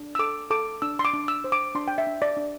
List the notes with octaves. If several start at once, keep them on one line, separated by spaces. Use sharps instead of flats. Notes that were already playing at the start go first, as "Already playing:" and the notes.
Already playing: D4
E6
A4 D6
A4 D6
D4 E6
C6
D6
D4
E6
C5
D6
D4 C6
G5
E5
D4
D5
D4